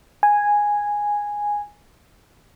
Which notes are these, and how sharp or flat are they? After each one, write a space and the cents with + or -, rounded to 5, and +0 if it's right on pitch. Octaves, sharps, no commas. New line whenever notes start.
G#5 -5